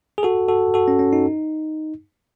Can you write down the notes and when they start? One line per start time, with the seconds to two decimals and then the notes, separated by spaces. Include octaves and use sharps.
0.18 G#4
0.23 F#4 A4
0.48 F#4 A4
0.74 F#4 A4
0.88 C#4
0.99 C#4
1.13 D#4